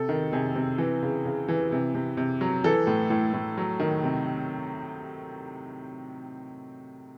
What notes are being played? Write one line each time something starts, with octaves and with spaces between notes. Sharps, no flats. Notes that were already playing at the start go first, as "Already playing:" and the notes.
Already playing: C3 A4
D#3
C3 G#4
C3
E3
C#3
C#3
E3
C3
C3
C3
F#3
E3 A4
A2
A2
A2
F#3
D#3
C3